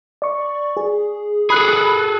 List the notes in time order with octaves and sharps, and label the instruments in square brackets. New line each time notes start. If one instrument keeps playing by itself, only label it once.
[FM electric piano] D5 C#6
G#4
[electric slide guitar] G#4 A4 [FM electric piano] B5 F#6